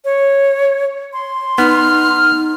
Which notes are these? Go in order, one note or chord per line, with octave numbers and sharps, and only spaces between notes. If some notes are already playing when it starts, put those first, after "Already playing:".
C#5
C6
B3 D#4 F6